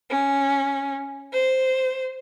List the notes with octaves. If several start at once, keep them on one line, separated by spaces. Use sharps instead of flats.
C#4
C5